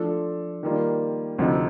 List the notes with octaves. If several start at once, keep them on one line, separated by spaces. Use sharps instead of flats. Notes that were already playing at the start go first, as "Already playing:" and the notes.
Already playing: F3 A3 D4 F4 A4
D#3 G3 A#3 F4
D2 C3 F3 C4 D#4